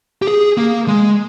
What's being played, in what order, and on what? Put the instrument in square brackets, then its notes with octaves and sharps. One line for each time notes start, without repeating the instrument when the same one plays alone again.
[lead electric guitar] G4
G#4
A#3
G#3